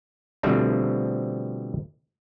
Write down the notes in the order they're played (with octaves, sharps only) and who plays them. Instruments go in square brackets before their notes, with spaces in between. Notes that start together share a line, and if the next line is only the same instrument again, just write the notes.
[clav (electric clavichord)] B2 D3 F3 G3 A3 C4